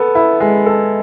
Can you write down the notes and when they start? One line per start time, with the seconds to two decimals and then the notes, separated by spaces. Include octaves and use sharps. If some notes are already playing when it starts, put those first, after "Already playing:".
Already playing: B3 A4
0.15 E4
0.40 G#3
0.66 A4